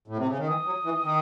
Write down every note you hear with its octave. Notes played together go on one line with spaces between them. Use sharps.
A2
C3
C#3
D#3
E3 D#6
F#3
E3
D#3